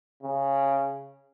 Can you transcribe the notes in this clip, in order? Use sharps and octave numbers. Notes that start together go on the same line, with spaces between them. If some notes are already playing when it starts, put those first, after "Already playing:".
C#3